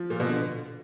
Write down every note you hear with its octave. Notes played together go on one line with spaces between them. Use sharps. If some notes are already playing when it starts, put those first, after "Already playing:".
Already playing: F3
A#2
B2
D3